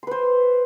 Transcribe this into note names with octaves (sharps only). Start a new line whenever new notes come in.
B4 C5 C6